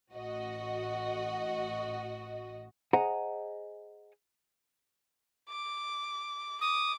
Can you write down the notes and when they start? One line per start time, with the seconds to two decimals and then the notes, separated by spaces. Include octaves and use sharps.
0.13 A1 F#4 D#5
2.93 G#4 C5 D#5 F#5 G#5 A#5
5.49 D6
6.61 D6 D#6